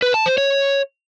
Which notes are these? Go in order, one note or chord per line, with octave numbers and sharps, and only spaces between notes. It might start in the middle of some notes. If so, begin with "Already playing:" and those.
B4
A5
C5
C#5